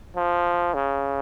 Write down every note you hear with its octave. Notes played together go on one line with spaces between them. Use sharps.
F3
C#3